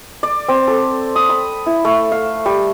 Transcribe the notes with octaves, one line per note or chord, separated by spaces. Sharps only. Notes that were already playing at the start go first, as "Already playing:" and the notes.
D5
C4
A4
D#6
B5
E4
A3
F5
G3